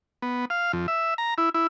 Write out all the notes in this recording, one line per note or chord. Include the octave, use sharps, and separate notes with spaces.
B3
F5
F2
E5
A#5
E4
E4